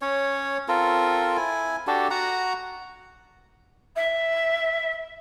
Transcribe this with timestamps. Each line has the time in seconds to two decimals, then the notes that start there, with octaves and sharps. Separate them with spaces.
0.02 C#4 C#5
0.68 C4 F4 A4 A#4
1.37 E4 G#5
1.87 D4 F#4 G4 A4
2.11 F#4 F#5 A#5
3.96 E5